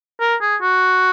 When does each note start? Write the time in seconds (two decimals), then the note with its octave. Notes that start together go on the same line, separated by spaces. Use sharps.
0.20 A#4
0.41 G#4
0.62 F#4